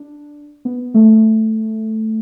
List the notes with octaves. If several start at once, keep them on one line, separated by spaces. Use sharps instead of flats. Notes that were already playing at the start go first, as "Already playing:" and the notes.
Already playing: D4
B3
A3